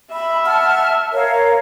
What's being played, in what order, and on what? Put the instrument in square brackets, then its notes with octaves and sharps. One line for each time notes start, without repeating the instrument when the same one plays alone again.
[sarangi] E5 [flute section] B5
[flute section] F#5 A5 F6
A#4 C#5 F5